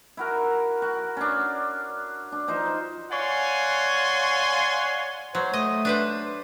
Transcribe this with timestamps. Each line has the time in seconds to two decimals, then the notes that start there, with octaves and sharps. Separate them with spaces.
0.17 E4 F#4 A#4
0.82 F#4
1.17 C#4 D4
2.32 D4
2.48 F3 D#4 C5
3.12 C#5 D5 F5 F#5 G#5 C6
5.35 F#3 C5
5.53 A3 D#5
5.85 D4 B4 C5